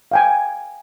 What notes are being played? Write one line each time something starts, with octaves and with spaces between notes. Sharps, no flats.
F5 G5 G#5